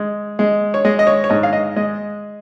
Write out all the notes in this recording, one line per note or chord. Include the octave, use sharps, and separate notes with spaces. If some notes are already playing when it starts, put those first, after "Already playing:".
Already playing: G#3
G#3
C#5
G#3 D#5
D#5
C#5
C#5
G#2 D#5
F5
D#5
G#3 D#5